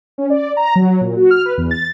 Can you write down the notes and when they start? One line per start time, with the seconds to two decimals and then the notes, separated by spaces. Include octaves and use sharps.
0.18 C#4
0.30 D5
0.57 A#5
0.76 F#3
1.01 A#2
1.17 F#4
1.31 F6
1.46 B4
1.58 E2
1.71 A6